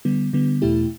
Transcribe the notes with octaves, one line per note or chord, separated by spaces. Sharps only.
D3 G3 B3
D3 G3 B3
E2 B2 A3 E4 G4